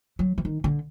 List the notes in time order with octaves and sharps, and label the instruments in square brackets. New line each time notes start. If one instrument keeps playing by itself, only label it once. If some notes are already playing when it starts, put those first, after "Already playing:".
[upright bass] F#3
E3
D#3
D3